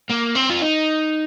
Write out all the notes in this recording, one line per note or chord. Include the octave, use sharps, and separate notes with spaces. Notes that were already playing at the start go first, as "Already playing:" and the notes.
A#3
C4
F4
D#4